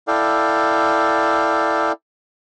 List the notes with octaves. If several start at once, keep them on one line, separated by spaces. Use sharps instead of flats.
E4 A4 D5 F5 G5